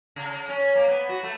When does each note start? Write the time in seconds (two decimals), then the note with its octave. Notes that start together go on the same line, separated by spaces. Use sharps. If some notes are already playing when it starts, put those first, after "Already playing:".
0.16 C#3
0.49 C#4
0.75 A#3
0.88 B3
1.09 F#4
1.23 A3